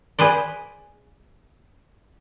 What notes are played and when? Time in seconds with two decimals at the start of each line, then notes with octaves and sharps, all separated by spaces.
0.19 G#4 B4 C5 D5